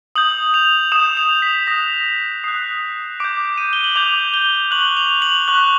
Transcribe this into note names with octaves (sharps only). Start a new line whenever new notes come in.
D#6 G6 F#7
F7
D#6 G6 E7
F7
B6
D#6 F#6 A#6
D#6 F#6 C7
D6 G6 D7
D#7
G7
F#7
D6 G6 F7
G7
C#6 F#6 F#7
F7
F#7
C#6 F#6